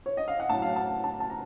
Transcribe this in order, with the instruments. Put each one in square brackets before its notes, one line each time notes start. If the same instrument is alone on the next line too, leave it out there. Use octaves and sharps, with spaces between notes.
[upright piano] C#5
D#5
F5
F#5
A2 F#3 A5
F5
F#5
A5
A5
A5
A#5